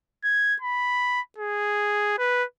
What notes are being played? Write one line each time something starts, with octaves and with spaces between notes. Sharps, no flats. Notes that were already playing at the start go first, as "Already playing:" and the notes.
G#6
B5
G#4
B4